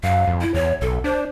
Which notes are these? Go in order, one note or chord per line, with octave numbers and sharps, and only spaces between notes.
F#2 F5
F2
E4
E2 C#5
B1 A4
D4 C5